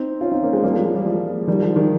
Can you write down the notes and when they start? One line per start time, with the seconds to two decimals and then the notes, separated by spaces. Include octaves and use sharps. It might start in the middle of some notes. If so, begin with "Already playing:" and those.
Already playing: C4 D#4
0.21 C#4 F4
0.32 C4 D#4
0.43 A#3 C#4
0.53 G#3 C4
0.63 G3 A#3
0.74 F3 G#3
0.84 F3 G#3
0.95 G3 A#3
1.05 F3 G#3
1.47 D#3 G3
1.62 F3 G#3
1.76 D#3 G3